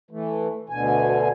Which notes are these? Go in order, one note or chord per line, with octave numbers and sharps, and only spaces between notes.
E3 A3
D2 B2 D3 G#5